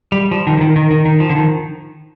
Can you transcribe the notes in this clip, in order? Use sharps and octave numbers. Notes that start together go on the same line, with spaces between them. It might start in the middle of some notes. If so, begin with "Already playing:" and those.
G3
F3
D#3
D3
D#3
D#3
D#3
D#3
F3
D3
D#3